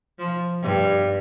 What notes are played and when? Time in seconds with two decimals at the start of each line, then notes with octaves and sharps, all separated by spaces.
0.19 F3
0.63 G2